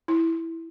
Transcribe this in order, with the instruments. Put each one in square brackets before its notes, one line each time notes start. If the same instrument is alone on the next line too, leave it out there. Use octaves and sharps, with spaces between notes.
[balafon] E4